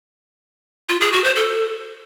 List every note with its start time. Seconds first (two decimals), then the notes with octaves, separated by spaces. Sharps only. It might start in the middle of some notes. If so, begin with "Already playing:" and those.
0.89 F4
1.01 G#4
1.13 F#4
1.24 C5
1.36 A4